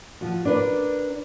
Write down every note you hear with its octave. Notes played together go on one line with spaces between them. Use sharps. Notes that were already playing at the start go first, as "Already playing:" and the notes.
F3 F#4
D4 A#4 B4 D5